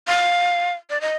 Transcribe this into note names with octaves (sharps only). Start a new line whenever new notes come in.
F5
D5
D#5